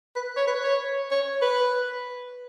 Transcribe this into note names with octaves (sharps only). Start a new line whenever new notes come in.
B4
C#5
B4
C#5
C#5
B4